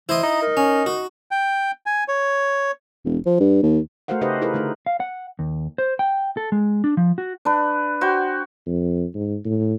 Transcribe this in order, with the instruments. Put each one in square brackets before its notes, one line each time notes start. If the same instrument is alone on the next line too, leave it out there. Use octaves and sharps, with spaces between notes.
[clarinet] E3 [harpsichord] E4 D#5 [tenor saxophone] C5
[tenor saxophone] D#4 [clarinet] A#5
[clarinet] A#4
[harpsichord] C#4
F#4
[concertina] G5
G#5
C#5
[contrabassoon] E1
F3
G2
D#2
[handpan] A3 F#4 A#4 C5 F5 F#5
C#3 D#4 G4 B4 C5 D#5
E4 F4 G#4 A#4 B4
D3 A3 D#4
[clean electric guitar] F5
F#5
D#2
C5
G5
A4
G#3
D4
F3
F#4
[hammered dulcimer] D4 B4
F#4 C5 G5
[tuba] F2
G#2
A2